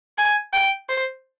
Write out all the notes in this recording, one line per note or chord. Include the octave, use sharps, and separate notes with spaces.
G#5
G5
C5